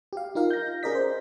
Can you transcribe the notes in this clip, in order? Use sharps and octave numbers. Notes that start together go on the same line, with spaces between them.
G4 F5
D#4 F4 A#4 F5
G6 A#6
C#4 G#4 A#4 D5 D#5 B6
C5